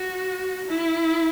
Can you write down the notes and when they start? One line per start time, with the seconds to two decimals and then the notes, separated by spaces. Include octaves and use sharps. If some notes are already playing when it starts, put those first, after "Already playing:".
Already playing: F#4
0.67 E4